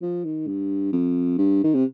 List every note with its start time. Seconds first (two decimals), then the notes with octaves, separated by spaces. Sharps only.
0.02 F3
0.24 D#3
0.47 G2
0.92 F2
1.38 G2
1.64 D#3
1.74 C3